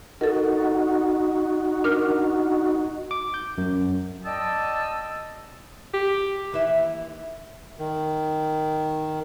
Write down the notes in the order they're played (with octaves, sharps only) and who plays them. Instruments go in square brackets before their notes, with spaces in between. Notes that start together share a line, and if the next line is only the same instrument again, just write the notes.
[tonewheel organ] D#4 F#4 [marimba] A4 A#4
[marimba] D4 A#4 F6
[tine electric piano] D6
G6
F#2
[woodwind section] D5 D#5 G5 A5 D#6 E6
[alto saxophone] G4
[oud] D#2 E3 E5
[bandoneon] D#3